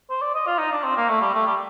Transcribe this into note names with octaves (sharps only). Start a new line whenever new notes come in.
C5
D5
D#5
F4
D#4
D4
C4
A#3
A3
G3
A3
G3